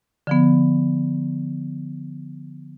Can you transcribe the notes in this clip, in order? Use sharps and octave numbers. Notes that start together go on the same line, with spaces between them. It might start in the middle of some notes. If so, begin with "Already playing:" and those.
D3 F3 B3